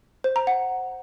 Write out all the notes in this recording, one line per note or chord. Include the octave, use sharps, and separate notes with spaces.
C5
A#5
F#5